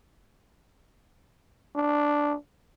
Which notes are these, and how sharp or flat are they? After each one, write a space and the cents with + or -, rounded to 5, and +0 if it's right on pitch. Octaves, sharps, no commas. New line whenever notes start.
D4 +0